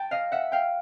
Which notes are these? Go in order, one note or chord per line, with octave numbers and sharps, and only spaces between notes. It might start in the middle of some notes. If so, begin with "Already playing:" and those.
Already playing: G5 A5
D#5 F5
E5 F#5
F5 G5